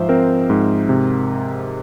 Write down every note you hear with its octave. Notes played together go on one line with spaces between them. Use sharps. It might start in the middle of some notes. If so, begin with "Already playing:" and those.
Already playing: G#2 F3 C5 E5
C4 A#4
G#2
C3